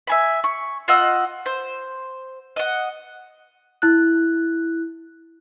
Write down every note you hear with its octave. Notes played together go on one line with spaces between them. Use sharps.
E5 G#5 B5
C#6
F4 D#5 F#5 E6
C5
D#5 F#5
E4 F#6